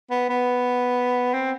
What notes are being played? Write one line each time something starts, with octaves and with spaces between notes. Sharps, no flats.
B3
B3
C4